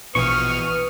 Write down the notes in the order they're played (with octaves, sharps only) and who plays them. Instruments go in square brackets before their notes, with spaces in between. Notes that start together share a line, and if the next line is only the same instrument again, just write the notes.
[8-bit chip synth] A#1 B2 E3 [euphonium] B4 [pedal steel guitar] C#6 [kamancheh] D#6 F6